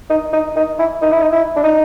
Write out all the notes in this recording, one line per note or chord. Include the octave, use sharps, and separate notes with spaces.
D#4
D#4
D#4
E4
D#4
E4
D#4
E4
D4
D#4